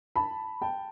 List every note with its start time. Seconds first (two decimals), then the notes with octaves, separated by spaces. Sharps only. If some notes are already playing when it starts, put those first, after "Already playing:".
0.16 A5 B5
0.62 G5 A5